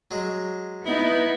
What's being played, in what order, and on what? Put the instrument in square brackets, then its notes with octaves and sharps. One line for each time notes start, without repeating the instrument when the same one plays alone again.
[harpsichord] F#3 G#3
[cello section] B3 [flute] D#4 [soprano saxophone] E4